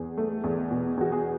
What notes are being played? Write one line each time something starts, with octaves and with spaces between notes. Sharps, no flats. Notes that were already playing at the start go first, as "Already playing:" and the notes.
Already playing: E2 G#4
A3
E2
B2
E2 F#4
G#4